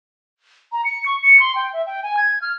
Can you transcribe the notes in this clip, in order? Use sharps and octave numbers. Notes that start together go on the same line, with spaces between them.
A#5
C#7
C#6
C#7
C6
G5
E5
G5
G#5
G#6
F6